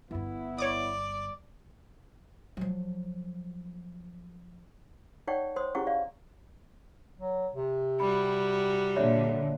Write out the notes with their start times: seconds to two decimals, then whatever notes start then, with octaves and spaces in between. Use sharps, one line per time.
0.11 G1 G2 B3 E4
0.58 C#5 D5 D6 D#6
2.57 F3 F#3
5.27 D#4 C#5 D5 F#5 G5 C#6
5.56 C5 C#5 C6 D#6
5.75 C#4 E4 G4 G#4 F#5 C#6
5.87 D5 F5
7.19 F#3
7.54 C3
8.00 G3 F#4 B5
8.96 A#2 D3 C#5 D5 E5